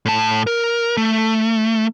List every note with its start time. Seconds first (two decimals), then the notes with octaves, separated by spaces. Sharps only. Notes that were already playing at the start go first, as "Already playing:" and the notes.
0.05 A2 A5
0.47 A#4
0.97 A3